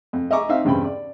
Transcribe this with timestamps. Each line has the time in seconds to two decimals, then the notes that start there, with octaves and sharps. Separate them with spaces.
0.13 F2
0.31 D#5 E5 G#5 A#5 C#6 D6
0.49 C4 D#4 E5 F5
0.65 E2 G2 C#3 C4 G5 B5
0.84 D5